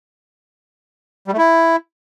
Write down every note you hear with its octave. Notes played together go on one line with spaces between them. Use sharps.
G3
A3
E4